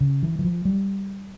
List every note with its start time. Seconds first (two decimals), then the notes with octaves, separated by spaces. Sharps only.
0.01 C#3
0.23 E3
0.39 E3
0.45 F3
0.65 G3